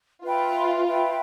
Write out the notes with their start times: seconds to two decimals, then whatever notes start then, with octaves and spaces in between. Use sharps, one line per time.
0.23 F4 B4 E5 G5 B5
0.85 B4 E5 G5 B5